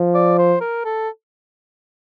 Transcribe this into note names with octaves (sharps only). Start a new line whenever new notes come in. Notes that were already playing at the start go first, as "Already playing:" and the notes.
Already playing: F3
D5
C5
A#4
A4